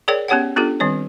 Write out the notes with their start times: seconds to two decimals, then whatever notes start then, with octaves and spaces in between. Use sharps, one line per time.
0.08 G#4 A#4 C#5 D5 G5
0.28 B3 C#4 G4 C#5 F#5 G5
0.56 B3 D4 F4 G4 A4
0.80 D#3 G3 C4 C#5